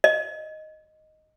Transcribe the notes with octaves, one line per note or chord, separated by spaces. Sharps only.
D#5